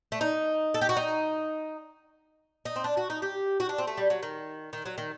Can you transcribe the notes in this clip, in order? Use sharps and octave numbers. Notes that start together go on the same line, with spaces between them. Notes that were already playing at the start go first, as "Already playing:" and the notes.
A3
D#4
A4
G4
F#4
D#4
D#4
C4
D4
F#4
D#4
G4
F#4
D4
C4
A3
G3
F#3
D#3
D#3
F#3
D#3